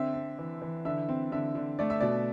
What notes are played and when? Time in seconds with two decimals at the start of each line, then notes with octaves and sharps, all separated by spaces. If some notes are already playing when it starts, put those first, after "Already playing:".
Already playing: D3 C4 E5
0.14 C4
0.39 E3
0.62 E3
0.85 D3 E5
1.09 C4
1.32 D3 E5
1.55 D3
1.79 A3 D5
1.90 E5
2.01 B2 D5